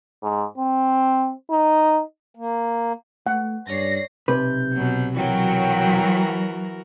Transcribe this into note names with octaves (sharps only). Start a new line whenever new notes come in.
G#2
C4
D#4
A#3
A3 F#5
G2 C#4 C#5 D5 A#6 C7
B1 C3 B4 G6
B2 F#3
E3 F#3 F#4 A#4 G5